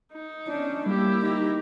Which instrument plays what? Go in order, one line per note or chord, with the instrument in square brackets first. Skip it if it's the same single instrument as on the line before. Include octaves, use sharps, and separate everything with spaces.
[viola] D#4
[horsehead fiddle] C#4 D4
[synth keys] G3 [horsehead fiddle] A#3 [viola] E4 G4
[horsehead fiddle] D#4